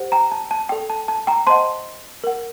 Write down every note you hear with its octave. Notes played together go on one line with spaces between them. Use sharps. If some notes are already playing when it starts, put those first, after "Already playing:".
Already playing: G4 C5 F#5
G5 A#5
A5
A5
A4 D5 G5
A5
A5
G5 A#5
C5 D#5 F#5 A5 C6
A#4 F#5